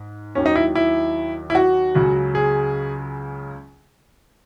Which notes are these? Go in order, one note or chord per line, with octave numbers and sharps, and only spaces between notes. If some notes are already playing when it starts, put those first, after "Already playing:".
Already playing: G#2
D#2 D#3 F#3 C#4
D#4
E4
E4
E4
F#4
C#2 C#3 F#3
G#4